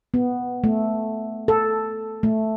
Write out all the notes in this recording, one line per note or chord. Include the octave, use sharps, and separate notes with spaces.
B3
A3
A4
A3